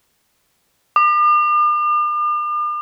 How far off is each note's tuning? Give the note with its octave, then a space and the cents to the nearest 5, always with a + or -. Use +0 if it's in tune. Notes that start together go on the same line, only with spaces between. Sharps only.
D6 +45